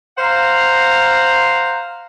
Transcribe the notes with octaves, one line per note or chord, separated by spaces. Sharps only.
C5 F5 F#5 A#5